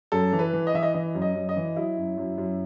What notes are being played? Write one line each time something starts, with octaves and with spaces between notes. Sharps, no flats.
F#2 A4
E3
B4
E3
D#5
E3 E5
D#5
E3 D#5
F#2
D#5
F#2
D#5
E3
F#3 E4
F#2
F#2
F#2